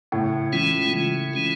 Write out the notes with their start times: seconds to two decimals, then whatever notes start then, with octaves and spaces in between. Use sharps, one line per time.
0.12 A2 C#3
0.52 E3 G#3 C#4 F4
0.94 C#3
1.34 E3 G#3 C#4 F4